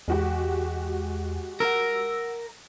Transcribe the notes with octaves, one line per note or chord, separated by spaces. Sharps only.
E2 G#3 F#4 G4
A#4 F#5 E6